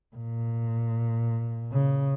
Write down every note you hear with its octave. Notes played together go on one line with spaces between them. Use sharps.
A#2
C#3